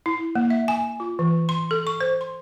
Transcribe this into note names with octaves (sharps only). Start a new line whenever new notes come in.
E4
A#3
E5
G#5
F4
E3
C6
A4
C#6
C5
C6